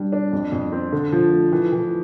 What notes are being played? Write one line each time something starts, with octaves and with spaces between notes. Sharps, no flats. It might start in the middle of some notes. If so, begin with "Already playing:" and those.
Already playing: G3 D4
D4
F2
F2
C4
D3
F3
A3
E3
E3